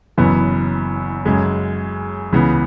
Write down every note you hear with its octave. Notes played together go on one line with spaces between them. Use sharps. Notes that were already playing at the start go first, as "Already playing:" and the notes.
F#1 F#2 E3 B3
F#2 C#3 G#3
C#2 C#3 E3 B3